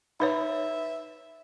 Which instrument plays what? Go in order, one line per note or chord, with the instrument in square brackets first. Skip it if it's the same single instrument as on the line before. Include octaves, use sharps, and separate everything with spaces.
[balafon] D#4 B4 C#5 [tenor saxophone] E5